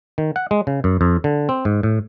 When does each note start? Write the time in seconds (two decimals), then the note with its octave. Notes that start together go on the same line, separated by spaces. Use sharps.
0.18 D#3
0.36 F#5
0.51 G#3
0.67 C#3
0.84 F#2
1.01 F2
1.24 D3
1.49 C4
1.65 G#2
1.83 A2